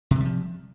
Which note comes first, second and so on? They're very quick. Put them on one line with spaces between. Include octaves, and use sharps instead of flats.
C3 E3 G3 F3